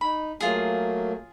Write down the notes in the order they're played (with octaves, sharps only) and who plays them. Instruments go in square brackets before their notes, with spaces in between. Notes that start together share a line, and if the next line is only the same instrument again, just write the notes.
[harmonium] D#4 [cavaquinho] B5
[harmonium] F#3 A3 A#3 [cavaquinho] F4 G#4